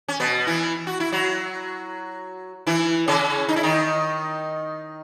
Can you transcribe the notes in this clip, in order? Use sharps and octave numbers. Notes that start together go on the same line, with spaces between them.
C#4
B2 B3
E3 E4
F#4
E4
F#3 F#4
E3 E4
C#3 C#4
D#4
E4
D#3 D#4